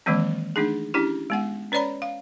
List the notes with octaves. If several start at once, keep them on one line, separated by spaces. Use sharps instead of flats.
D#3 E3 F#3 G#3 A#3 C4
A3 D4 D#4 G#4
C#4 D4 E4 G4
G#3 B3 F#5
C#4 B4 C#5 D5 A#5 B5
F5